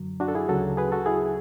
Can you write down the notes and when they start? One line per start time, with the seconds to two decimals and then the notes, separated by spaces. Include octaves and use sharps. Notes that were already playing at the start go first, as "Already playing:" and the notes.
Already playing: F#2 D3 F#3
0.20 D4 F#4
0.28 A4
0.35 E4 G#4
0.49 D2 C#3 F#3 F#4 A4
0.77 G#4 B4
0.92 F#4 A4
1.06 E4 G#4